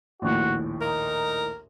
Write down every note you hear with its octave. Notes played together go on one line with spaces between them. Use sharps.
A#1 D#2 A2 F#4
D#4 A#4